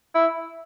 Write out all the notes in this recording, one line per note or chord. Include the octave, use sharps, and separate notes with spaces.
E4